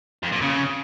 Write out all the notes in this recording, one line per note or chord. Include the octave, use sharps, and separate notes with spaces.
F2
A#2
C#3